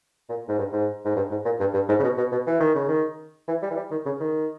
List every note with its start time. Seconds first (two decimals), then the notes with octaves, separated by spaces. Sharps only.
0.29 A#2
0.49 G#2
0.58 G2
0.73 G#2
1.05 G#2
1.16 G2
1.31 G#2
1.45 A#2
1.60 G2
1.74 G2
1.89 G#2
1.99 C#3
2.03 B2
2.18 B2
2.32 B2
2.47 E3
2.60 D#3
2.75 C#3
2.89 D#3
3.48 E3
3.62 G3
3.71 E3
3.77 G3
3.91 D#3
4.06 C#3
4.20 D#3